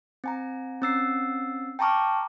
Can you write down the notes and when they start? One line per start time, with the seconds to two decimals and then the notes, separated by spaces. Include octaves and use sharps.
0.24 C4 G#5 A#5
0.82 C4 C#4 E6 A6 C7
1.79 G5 A5 A#5 C#6 D6 F6